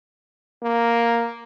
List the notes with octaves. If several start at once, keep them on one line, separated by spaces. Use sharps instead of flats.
A#3